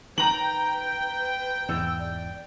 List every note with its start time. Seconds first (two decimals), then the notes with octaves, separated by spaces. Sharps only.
0.18 D#3 B4 G5 A#5 F#7
1.69 E2 G#2 E6
1.99 D5